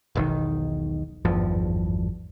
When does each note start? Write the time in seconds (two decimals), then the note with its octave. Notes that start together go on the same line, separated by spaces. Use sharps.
0.15 E1 B1 D#3
1.25 G#1 E2 G2 F3